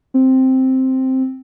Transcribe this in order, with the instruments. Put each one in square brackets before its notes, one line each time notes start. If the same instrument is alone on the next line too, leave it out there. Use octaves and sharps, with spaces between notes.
[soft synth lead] C4